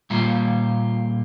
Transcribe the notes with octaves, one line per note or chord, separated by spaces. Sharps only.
A#2 G3 A#3 F4